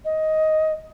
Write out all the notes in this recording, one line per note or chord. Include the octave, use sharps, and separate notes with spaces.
D#5